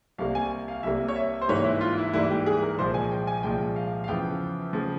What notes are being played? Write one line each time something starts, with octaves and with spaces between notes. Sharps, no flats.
C2 C3 G3 A#3 F5
G#5
F5
C2 C3 G3 A#3 E5
C#5
E5
C5
G#2 E3 G3 A#3 C#5
E4
F4
E4
G#2 E3 G3 A#3 E4
G4
G#4
A#4
C2 A#2 F3 G#3 C5
G#5
G5
G#5
C2 A#2 F3 G#3 G5
F5
F5
E2 C#3 F3 G5
C#3 F3